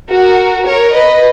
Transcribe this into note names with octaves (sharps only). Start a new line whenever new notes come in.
F#4 A#4
A#4 C#5
B4 D#5